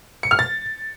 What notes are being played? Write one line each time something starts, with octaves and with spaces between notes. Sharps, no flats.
C#7
F6
A6